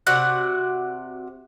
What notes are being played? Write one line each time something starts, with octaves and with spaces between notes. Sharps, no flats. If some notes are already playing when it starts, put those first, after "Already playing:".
C3 F#4 D5 F#5